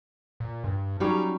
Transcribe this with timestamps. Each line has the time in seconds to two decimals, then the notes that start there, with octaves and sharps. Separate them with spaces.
0.40 A#2
0.64 G2
1.00 F#3 G3 C#4 D#4